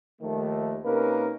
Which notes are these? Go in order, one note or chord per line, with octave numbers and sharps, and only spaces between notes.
D#2 D#3 F3 A3
C3 A#3 C#4 D#4 A#4 B4